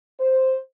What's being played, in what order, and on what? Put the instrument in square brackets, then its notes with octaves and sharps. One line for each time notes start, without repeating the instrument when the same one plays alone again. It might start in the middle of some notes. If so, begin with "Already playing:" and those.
[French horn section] C5